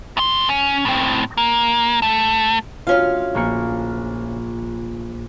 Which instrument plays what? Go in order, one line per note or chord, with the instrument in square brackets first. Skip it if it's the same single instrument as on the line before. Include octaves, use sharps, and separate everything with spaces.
[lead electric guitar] A2 C6
C#4
A2 C4
A#3
A3
[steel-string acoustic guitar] D2 C#4 F5 [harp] F4
[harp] A#1 A#3 C#7